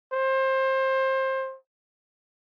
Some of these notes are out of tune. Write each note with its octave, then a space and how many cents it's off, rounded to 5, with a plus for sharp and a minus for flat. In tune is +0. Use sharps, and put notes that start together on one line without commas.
C5 +25